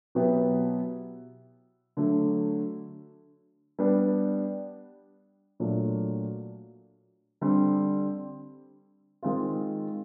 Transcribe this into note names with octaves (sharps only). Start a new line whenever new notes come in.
B2 F#3 B3 E4 G4
D3 F#3 A3
G3 B3 D4
A#2 F#3 A3 D4
D3 G3 C4
D#3 G#3 C4 F4